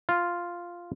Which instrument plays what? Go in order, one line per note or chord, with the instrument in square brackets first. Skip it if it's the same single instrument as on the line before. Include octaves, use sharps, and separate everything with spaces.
[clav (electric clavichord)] F4